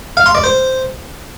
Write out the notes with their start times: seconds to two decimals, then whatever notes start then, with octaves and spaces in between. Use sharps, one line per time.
0.17 F5
0.26 C6
0.35 D5
0.44 C5